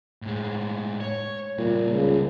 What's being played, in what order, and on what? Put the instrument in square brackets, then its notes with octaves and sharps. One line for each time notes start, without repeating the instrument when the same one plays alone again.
[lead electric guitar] A2 G#3
C#5
[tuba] A#2 [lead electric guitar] C#3 G3
[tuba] C#2